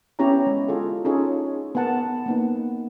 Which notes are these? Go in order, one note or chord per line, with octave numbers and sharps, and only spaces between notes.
B3 C#4 E4 G4 C#5 A#5
G#3
F4 G#4 A4
C#4 D#4 F4 G#4 A4 C#5
B3 A#4 F#5 A5
A#3 B3 D#4